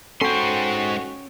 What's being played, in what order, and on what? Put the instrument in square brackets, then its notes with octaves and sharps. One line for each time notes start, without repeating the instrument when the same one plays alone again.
[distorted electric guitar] G#2 C6 [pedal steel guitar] C#4 G5 [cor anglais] F#4 [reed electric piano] A4